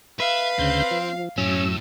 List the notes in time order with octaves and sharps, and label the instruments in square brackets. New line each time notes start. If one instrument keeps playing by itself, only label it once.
[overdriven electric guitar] B4 [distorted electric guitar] E5 [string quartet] F5
[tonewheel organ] D2 C#3 G6 [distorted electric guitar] C4
[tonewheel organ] F3
[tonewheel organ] F#2 E6 [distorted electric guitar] A2 [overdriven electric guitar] C#4